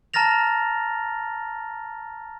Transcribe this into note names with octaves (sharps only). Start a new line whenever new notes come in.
A5 A#5 F6 A6 A#6 F7